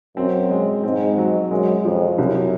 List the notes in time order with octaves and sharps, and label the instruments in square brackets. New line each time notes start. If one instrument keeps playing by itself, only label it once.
[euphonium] F#2 [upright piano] C4
[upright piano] G#3
[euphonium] G#2 [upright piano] C4
[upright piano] F#3
[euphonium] F#2 [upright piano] G#3
[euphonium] F2 [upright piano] F3
[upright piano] C2 [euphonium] F#2